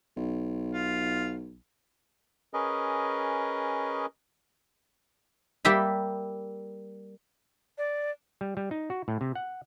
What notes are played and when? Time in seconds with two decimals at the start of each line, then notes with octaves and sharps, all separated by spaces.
0.17 B1
0.73 F4
2.54 C#4 G#4 A#4 B4 D#5
5.65 G3 A#3 G4 E5 B5
7.78 D5
8.41 G3
8.57 G3
8.71 D#4
8.90 F#4
9.08 A2
9.21 C3
9.35 F#5